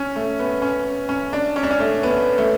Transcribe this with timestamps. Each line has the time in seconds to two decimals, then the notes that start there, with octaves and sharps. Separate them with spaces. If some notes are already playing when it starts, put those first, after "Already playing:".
Already playing: C#4
0.16 A3
0.39 B3
0.62 C#4
1.09 C#4
1.33 D4
1.56 C#4
1.63 D4
1.71 C#4
1.79 A3
2.03 B3
2.38 A3